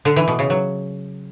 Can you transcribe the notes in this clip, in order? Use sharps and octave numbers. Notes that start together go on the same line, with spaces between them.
D3
E3
B2
C#3
F#3